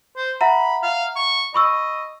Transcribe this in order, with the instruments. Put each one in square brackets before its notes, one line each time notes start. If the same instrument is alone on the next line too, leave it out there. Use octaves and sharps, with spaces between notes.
[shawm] C5
[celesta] E5 F#5 A#5 [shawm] B5
[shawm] F5
C#6
[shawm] D#5 [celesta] B5 C#6 E6